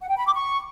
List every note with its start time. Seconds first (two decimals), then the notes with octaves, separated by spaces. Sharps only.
0.01 F#5
0.09 G5
0.18 B5
0.26 D6
0.34 C#6